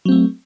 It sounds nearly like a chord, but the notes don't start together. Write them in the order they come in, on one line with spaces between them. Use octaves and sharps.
F#3 C4 A3